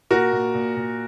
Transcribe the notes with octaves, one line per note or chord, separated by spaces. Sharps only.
A#2 F#4 A#4
A#2
A#2
A#2